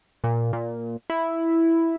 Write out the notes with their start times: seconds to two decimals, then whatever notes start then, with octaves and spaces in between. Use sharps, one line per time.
0.24 A#2
0.53 A#2
1.10 E4